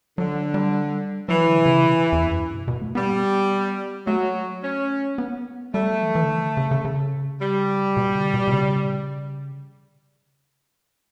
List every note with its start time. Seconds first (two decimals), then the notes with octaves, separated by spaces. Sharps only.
0.18 D3 F#3
0.54 G3
1.29 E3 F#3
1.47 D3
1.58 B2
1.66 C#3
1.84 B2
2.12 E2
2.26 F#2
2.40 G2
2.54 B2
2.68 B2
2.82 A3
2.95 G3 B3
4.06 F#3 A3
4.63 C#4
5.18 B3
5.73 G3 A3
5.88 F#3
6.01 E3
6.15 E3
6.23 D3
6.29 E3
6.43 D3
6.57 C#3
6.71 C#3
6.85 C#3
7.41 G3
7.97 B2
8.15 D3
8.34 B2
8.48 B2
8.52 C#3